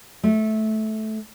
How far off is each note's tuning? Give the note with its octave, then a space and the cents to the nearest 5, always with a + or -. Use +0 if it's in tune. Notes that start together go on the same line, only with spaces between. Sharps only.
A3 -15